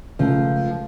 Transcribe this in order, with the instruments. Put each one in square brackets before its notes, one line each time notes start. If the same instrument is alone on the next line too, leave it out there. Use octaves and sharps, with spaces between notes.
[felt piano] C#2 [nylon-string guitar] F3 A3